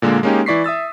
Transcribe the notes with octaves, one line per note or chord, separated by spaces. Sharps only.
A#2 D3 G#3 A#3
G#3 A#3 C#4 D#4 G4
E3 E4 D5 C#6 B6 C7
E5 D#6 E6 A6